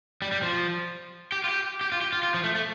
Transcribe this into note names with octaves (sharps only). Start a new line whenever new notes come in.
G3
G3
F3
G4
F4
G4
G4
F4
G4
F4
F4
F3
A3
A3